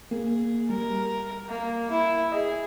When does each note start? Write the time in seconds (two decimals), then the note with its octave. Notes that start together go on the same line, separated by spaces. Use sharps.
0.11 A#3 G#4
0.70 G3 A#4
1.49 A#3
1.91 E4
2.32 G#4 D#5